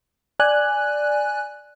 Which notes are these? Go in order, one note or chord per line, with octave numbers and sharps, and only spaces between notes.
D5 G#5 F#6